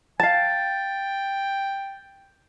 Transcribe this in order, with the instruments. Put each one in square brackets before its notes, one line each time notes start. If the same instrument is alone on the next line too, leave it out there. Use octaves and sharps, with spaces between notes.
[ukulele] F5 A5 [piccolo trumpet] G5 [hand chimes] A6